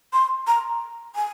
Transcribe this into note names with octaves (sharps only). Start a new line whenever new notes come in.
C6
A#5
G#5